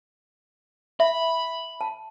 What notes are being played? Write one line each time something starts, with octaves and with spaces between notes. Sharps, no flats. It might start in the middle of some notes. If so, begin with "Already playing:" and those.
E5 B5
A5